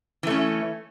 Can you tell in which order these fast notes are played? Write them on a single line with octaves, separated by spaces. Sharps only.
E3 A3 C#4